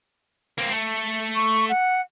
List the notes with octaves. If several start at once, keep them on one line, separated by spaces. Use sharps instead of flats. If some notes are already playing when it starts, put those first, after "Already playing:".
A#3 C4
A3
C#6
F#5